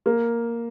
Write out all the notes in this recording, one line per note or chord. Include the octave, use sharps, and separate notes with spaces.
A#3